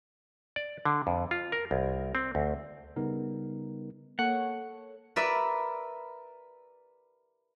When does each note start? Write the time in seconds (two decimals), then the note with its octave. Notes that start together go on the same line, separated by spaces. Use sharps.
0.56 D5
0.85 D3
1.07 F2
1.31 F4
1.52 A#4
1.71 C2
2.15 C4
2.35 D2
2.96 C#3 G3 B3 D#4 A#4
4.19 A#3 A4 C#5 F#5
5.16 A#4 B4 D5 E5